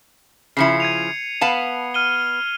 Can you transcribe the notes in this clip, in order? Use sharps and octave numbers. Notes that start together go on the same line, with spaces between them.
C#3 F3 E4 C7 C#7
G#6 D#7 F7
B3 F5 A5
F6 D#7 G7